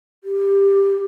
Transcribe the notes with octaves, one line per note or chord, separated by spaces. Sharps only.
G4